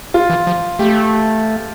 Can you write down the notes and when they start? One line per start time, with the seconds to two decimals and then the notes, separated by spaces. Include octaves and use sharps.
0.14 F4
0.30 E3
0.47 F3
0.79 A3 G4